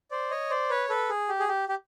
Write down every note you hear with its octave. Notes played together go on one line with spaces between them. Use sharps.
C5 D5
C#5 D#5
C5 D5
B4 C#5
A4 B4
G#4
G4
G#4
G4
G4